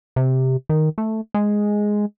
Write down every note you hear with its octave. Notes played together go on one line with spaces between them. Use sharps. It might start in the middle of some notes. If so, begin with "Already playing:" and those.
C3
D#3
A3
G#3